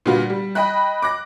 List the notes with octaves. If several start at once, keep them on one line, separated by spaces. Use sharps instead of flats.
A#2 D3 G3 B3 F4 F#4
G3
D#5 G5 B5 F#6
D6 F#6 A#6